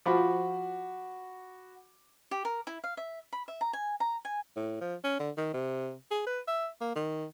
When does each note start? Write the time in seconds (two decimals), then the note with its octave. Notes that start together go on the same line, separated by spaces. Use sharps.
0.06 F3 F#4 B5 D6
2.31 G4
2.45 A#4
2.67 E4
2.84 F5
2.97 E5
3.32 B5
3.48 E5
3.61 A#5
3.73 G#5
4.00 A#5
4.25 G#5
4.56 A2
4.81 F3
5.04 C#4
5.20 D3
5.38 D#3
5.54 C3
6.11 G#4
6.27 B4
6.48 E5
6.81 A#3
6.95 D#3